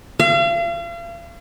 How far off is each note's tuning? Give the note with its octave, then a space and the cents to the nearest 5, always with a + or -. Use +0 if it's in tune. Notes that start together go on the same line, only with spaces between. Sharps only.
F5 -40